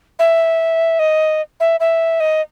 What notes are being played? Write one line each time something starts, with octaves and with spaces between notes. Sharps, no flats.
E5
D#5
E5
E5
D#5